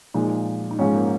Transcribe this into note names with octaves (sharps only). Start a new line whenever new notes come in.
A#2 F3 G#3 D#4
D#4
G#2 F3 G#3 C#4
A#3